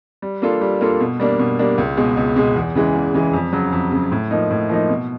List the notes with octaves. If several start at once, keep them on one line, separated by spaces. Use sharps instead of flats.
G3
A#3 D4 F4 A4
G3
A#3 D4 F4 A4
B2
G3 A#3 D4
B2
G3 A#3 D4
C#2
B2 G#3
C#2
B2 G#3
E2
C#3 E3 G#3
E2
C#3 E3 G#3
F2
C#3 F#3
F2
C#3 F#3
A2
F3 A#3 D#4
A2
F3 A#3 D#4
B2